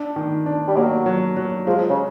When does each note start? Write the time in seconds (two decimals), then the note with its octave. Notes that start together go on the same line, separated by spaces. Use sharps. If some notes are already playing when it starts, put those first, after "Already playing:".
Already playing: D4
0.16 D#3
0.46 D4
0.68 G3
0.76 F#3 A#3
1.06 F#3
1.36 F#3
1.67 F3 G#3
1.89 C#3